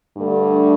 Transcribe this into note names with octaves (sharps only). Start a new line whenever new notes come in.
G2 D3 A3